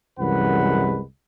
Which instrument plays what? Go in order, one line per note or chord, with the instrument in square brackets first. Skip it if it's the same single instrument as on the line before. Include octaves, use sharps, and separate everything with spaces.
[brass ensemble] C2 F#2 E3 G#3 B4 F#5